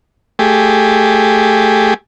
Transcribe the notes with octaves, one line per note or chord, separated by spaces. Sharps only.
A3 G4 G#4